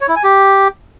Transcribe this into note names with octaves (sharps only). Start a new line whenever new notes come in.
C#5
E4
G#5
G4